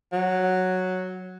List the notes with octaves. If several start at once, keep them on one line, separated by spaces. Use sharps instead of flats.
F#3